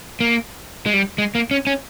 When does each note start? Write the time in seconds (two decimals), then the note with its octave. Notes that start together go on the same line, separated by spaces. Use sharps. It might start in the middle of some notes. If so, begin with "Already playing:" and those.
0.20 A#3
0.86 G#3
0.94 G3
1.18 G#3
1.35 A#3
1.51 C#4
1.67 C#4